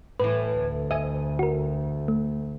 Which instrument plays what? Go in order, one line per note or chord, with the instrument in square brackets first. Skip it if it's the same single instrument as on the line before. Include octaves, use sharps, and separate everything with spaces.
[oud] A2 E3 [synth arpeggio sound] B4
[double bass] D2
[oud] D#5 [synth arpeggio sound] E5 G#5
[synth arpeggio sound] F#4 A#4
A3